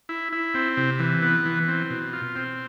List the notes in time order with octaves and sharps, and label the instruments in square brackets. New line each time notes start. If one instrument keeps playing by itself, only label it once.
[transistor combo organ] E4
E4
C4
C3
E3
B3
E3
C4
B2
F4
C4